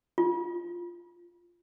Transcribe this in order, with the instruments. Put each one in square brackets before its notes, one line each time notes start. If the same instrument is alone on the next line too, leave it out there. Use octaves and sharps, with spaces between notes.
[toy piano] F4